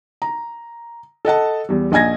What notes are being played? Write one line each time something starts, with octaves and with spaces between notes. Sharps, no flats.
A#5
A4 D#5 F#5 A5
E2 G3
A#1 D#5 G#5 G#6 A#6